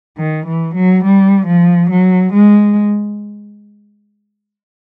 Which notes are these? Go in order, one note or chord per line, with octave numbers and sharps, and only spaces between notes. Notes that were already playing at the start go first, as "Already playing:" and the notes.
D#3
E3
F#3
G3
F3
F#3
G#3